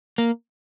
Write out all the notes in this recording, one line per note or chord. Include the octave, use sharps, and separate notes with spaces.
A#3